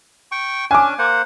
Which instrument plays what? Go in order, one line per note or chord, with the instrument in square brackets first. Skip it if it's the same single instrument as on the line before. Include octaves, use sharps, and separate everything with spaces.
[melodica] G5 C#6
[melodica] C#4 D4 [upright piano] G#5 D6
[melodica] A#3 C5 F#5